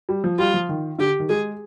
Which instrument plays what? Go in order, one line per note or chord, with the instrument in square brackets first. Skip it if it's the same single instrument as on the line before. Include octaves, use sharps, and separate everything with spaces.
[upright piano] G3
F3
[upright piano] G3 [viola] F4
[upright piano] F3
D#3
[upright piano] D3 [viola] G4
[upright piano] D#3
[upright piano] G#3 [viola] G#4